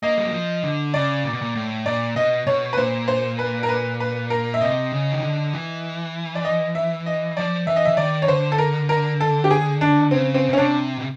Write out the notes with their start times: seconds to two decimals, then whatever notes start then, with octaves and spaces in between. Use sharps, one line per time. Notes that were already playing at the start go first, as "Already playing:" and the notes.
0.03 A#3 D#5
0.18 G3
0.26 F#3
0.33 F3
0.63 D3
0.94 C#3 D5
1.24 A#2
1.33 B2
1.42 A#2
1.55 A2
1.86 A#2 D5
2.16 B2 D#5
2.47 B2 C#5
2.73 B4
2.78 A#2 C5
3.08 C5
3.39 B4
3.63 A#4
3.69 B4
4.00 B4
4.30 A#4
4.54 E5
4.61 C3 D#5
4.92 C#3
5.11 D#3
5.23 D3
5.53 E3
6.35 D5
6.45 D#5
6.75 E5
7.06 D#5
7.37 F3 D5
7.67 E3 E5
7.76 D#5
7.85 E3 E5
7.97 D#3 D5
8.22 C#5
8.28 D3 C5
8.52 A4
8.58 A#4
8.89 A#4
9.20 A4
9.44 G4
9.51 G#4
9.81 D4
10.11 C#3 C4
10.34 C4
10.49 B2
10.53 C#4
10.58 C3 D4
10.98 B2